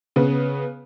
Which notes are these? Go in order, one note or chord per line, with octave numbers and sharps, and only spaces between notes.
C#3 B3